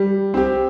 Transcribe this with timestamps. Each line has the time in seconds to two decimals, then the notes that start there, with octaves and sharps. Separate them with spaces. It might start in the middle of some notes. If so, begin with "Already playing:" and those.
Already playing: G3
0.34 C4 G4